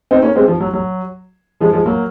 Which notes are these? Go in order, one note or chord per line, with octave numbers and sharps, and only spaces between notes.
C4 D#4
A#3 C#4
G#3 C4
F3
F#3
F#3
F3 G#3
F3 G#3
F#3 A#3